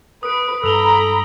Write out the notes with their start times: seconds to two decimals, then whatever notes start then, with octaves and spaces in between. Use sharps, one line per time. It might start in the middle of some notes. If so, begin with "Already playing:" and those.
0.23 B4 D#6 D7
0.63 G2 A4 A#5 B5 E6 F7 G7